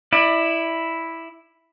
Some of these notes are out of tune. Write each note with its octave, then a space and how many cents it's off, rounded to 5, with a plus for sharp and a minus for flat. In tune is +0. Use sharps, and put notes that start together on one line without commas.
E4 +0 D5 +30